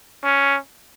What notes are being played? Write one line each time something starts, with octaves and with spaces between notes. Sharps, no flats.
C#4